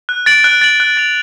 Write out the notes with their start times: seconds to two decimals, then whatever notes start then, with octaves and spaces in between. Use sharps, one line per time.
0.09 F#6
0.26 A6 D7 F#7
0.44 F#6
0.62 A6 D7 F#7
0.80 F#6
0.97 A6 D7 F7